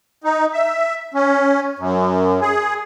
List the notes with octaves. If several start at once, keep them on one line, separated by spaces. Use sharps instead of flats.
D#4
E5
C#4
F#2
G#4